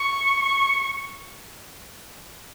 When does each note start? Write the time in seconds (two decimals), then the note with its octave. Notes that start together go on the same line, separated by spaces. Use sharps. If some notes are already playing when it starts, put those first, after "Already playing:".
Already playing: C#6
0.40 C#6